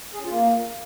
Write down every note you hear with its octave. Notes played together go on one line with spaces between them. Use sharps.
G#4
C#4
F4
A#3